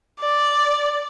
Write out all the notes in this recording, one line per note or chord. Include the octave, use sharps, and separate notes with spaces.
D5